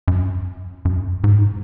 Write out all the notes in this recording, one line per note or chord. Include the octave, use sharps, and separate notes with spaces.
F#2
F#2
G#2